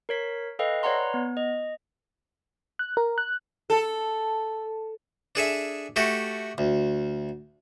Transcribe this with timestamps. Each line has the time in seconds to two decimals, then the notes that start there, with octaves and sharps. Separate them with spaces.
0.09 A#4 C#5 B6
0.59 A4 B4 D#5 F5 G5
0.83 B4 C#5 D5 F#5 A#5 C6
1.14 B3
1.37 D#5
2.79 F#6
2.97 A#4
3.18 F#6
3.70 A4
5.35 D4 G#4 A4 E5
5.96 A3 F#4 G4 A4
6.58 D2